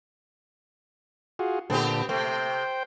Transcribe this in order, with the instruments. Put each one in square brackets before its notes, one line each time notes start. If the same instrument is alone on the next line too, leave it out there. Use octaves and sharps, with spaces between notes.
[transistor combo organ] F4 F#4 G#4
[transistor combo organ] A#2 D3 A4 [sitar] B3 C4 G4
[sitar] C3 A3 [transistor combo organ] C5 G5